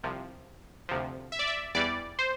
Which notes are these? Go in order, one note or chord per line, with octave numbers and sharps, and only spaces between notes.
C2 C3 F3
D2 C3 F3
E5
D5
E5
E2 E3 G3 D5
C5